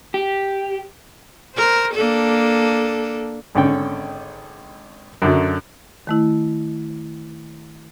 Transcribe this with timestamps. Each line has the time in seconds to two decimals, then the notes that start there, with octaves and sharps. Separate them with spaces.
0.14 G4
1.56 A#4 C5
1.94 A#3 D4 A4
3.55 G#1 D3 C#4 G5
5.22 F#2 D3 F#3
6.07 D#3 A3 E4